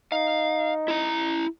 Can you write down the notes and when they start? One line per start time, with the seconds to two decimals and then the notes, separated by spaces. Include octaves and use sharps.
0.12 D#4 F5
0.88 E4 A#5